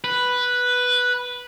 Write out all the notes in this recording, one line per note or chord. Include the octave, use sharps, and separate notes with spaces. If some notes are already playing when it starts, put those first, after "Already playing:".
B4